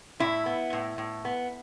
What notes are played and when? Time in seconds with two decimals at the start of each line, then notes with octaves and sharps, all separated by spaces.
0.20 A2 E4
0.46 B3
0.73 A2
0.98 A2
1.25 B3